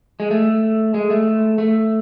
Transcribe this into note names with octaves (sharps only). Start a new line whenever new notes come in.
G#3
A3
G#3
A3
A3